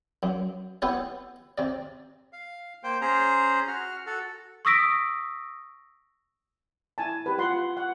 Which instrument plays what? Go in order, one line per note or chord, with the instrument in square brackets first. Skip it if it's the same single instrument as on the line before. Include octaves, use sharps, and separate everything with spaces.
[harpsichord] F#2
B3 E4 G4 C#5
C3 D5
[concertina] F5
A#3 C5 G5
C#4 G#4 C5 A#5
F#4 F6
F#4 A4
[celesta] C#6 D#6 E6 A#6 B6 D7
[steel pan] E4 G#5 A5
G4 B4
F4 F#5 C6
F#5